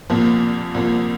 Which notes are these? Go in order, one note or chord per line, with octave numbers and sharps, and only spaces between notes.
C2 A#2 F3 A#3
C2 A#2 F3 A#3